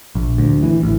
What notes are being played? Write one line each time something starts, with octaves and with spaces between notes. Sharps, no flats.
A#1
D2
E3
A1